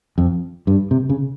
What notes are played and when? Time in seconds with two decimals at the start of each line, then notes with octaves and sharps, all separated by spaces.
0.18 F2
0.67 G2
0.91 C3
1.09 C#3